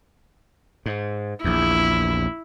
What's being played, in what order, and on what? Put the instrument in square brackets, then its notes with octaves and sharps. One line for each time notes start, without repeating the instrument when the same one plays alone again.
[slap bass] G#2
[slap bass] A#1 E2 [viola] E4